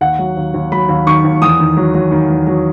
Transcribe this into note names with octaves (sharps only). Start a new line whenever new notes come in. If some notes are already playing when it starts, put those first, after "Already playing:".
D#2 F#5
F#3
D#2
D#2
F#3 B5
D#2
D#3 C#6
D#2
E2 D#6
D#3
F#3
F#3
D#3
E2
F#3